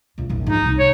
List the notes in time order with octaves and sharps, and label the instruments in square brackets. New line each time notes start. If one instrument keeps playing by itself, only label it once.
[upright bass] C#2 C3
A#1 E2
[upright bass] G#2 F3 [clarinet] D#4
[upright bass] C2 C3
[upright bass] D#4 [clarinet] C#5